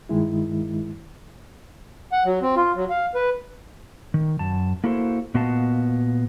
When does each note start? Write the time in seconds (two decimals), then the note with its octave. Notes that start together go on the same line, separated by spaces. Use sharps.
0.09 G2 D#3 G#3 E4
2.12 F#5
2.25 F#3
2.42 C4
2.56 F4
2.75 F#3
2.90 F5
3.15 B4
4.14 D#3
4.39 F#2 A5
4.84 A#3 E4 F#4 A4 C5
5.34 A#2 B3 F#4 D#5 F5 A5